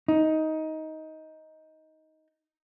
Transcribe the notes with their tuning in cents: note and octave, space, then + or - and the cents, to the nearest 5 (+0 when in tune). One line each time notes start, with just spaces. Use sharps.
D#4 +15